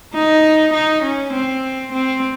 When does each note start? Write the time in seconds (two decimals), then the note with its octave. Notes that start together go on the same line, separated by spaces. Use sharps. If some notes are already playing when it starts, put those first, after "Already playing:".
0.14 D#4
0.73 D#4
1.03 C#4
1.33 C4
1.93 C4